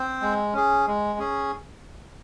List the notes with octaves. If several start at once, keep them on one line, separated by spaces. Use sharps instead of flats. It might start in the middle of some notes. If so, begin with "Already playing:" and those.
Already playing: C4 C5
G#3
C#4 G#4
G#3
C#4 G#4